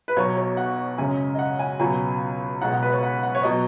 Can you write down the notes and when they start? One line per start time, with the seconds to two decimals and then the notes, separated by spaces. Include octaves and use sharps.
0.08 B4
0.16 B1 B2 F#3 C#5
0.37 C#5
0.57 F#5
0.98 F#2 C#3 G#3 G#5
1.34 D#5
1.39 F#5
1.59 G#5
1.80 C#2 B2 F#3 G#5
2.62 B1 B2 G#3 F#5
2.72 F#5
2.83 B4
2.92 C#5
3.03 F#5
3.23 F#5
3.35 C#5
3.43 B2 F#3 D#5